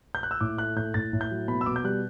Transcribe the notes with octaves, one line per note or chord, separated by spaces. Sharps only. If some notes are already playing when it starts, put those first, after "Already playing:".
G6
F#6
E6
A2 D6
A3 F#6
A2 G6
A2 A6
A2
G6
F#3
B2 B5
E6
B2 D6
G6
G3 F#6